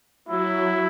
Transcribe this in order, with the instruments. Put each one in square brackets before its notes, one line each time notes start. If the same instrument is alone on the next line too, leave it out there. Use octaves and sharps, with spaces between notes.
[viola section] F#3 [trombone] E4